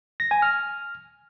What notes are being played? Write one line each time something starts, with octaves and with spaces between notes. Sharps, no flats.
A#6
G#5
F6